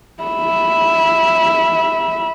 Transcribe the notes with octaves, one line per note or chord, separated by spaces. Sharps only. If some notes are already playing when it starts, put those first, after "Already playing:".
E5 B5